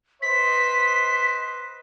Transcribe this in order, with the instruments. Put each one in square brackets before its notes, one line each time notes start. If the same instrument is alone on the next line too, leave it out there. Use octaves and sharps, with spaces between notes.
[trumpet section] B4 C5 D#5 [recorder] B6